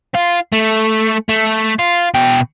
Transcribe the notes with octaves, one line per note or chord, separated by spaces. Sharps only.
F4
A3
A3
F4
B2 G5